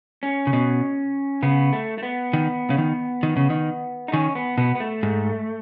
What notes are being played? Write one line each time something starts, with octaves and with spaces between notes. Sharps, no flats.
C#4
C#3
B2
C#3 B3
A3
A3
B3
D#3
C#3
D#3
D#3
C#3
D#3
D#4
D#3 C#4
B3
B2 B3
B3
A3
G#2